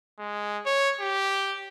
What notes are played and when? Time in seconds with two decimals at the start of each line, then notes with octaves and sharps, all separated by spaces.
0.19 G#3
0.66 C#5
1.00 G4